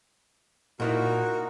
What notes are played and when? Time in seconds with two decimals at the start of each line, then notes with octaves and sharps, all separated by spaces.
0.80 A#2 A#3 D#4 E4 F#4 A#4